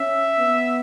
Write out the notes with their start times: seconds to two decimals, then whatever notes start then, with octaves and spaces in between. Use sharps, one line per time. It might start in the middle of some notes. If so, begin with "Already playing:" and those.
Already playing: C#4 E5
0.38 B3